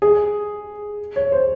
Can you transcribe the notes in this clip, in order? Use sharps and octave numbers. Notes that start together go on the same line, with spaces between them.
G#4
C#5
C5